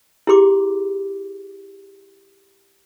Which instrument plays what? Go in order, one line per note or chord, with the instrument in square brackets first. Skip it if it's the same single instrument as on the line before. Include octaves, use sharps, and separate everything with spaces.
[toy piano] E4 G4 G#4 C6 D6